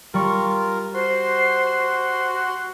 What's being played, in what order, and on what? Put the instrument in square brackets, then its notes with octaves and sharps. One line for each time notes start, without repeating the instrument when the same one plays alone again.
[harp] G3 C#6 [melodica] F4 A#4
[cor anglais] F#4 [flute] C5 [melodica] C6